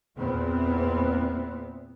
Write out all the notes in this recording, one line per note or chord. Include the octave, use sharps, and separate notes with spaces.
E2 A#2 B3 C4